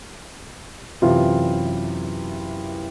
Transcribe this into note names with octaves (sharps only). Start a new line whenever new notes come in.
F#2 C3 E3 E4 F4